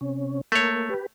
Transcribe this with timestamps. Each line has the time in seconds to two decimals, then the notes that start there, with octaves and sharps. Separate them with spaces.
0.01 C3 C#4
0.52 A3 A#3 C#5
0.90 G4 B4